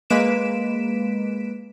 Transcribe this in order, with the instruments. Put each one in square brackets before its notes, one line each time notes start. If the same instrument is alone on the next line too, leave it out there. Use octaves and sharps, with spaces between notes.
[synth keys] G#3 A#3 B4 B6 D7 E7